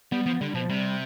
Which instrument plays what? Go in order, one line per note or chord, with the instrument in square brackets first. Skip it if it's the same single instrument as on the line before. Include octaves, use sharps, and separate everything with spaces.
[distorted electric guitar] G3 [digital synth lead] B3
[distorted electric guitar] F3 [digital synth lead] B3
[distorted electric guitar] D3 [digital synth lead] G3
[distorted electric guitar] B2 [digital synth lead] F3
[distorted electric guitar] C3 [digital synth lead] G3